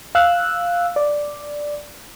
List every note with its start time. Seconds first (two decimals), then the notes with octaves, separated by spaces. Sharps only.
0.15 F5 E6 F#6
0.96 D5